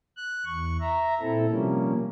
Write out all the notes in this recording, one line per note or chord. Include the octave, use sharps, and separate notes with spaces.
F#6
E2 C#6
E5 A#5
A#2 C4 E4 A4
C3 F3 G3 A#3 C#4